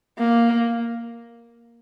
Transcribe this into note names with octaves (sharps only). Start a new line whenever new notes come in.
A#3